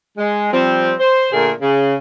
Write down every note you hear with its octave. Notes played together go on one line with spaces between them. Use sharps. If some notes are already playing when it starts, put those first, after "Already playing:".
G#3
F3 G3 C4
C5
A#2 D3 A3 G#4 A#4
C#3